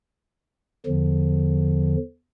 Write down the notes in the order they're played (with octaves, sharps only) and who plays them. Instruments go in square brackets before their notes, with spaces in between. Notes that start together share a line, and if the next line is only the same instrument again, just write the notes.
[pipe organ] E2 D3 F3